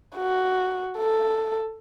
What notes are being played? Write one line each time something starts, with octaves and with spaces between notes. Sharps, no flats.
F#4
A4